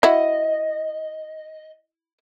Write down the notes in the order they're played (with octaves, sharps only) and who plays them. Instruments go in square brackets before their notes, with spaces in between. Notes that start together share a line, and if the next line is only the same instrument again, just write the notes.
[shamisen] E4 F#4 [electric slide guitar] D#5